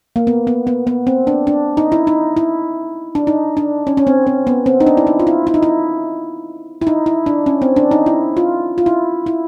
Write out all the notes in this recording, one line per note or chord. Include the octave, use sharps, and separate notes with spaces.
A#3
B3
B3
B3
B3
C4
D4
D4
D#4
E4
D#4
E4
D4
D#4
D4
C#4
C#4
C4
C4
B3
C4
D#4
D4
E4
D#4
F4
E4
E4
D#4
E4
E4
D#4
E4
D4
C#4
C4
D4
D#4
E4
F4
F4
E4
E4